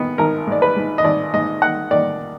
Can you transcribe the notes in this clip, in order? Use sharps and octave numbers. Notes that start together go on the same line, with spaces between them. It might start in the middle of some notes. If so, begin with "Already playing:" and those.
Already playing: G#1 D#3 B3
G#1 A#4
G#2 D5
B4
G#2
D#5
G#1 D5
G#2 D#5
D#3 F#5
D#3 D5